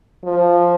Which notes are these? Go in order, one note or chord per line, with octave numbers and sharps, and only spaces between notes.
F3